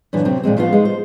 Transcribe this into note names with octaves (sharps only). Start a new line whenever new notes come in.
F#2 A#2 D3 E3
C3 F#3 C4
A#2 F3 G#3 C4
F3 A3 B3 F4
G#3 D#4
C5